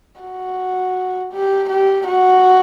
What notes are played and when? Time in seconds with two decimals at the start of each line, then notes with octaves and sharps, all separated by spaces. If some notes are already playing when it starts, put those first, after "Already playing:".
0.21 F#4
1.33 G4
1.70 G4
2.08 F#4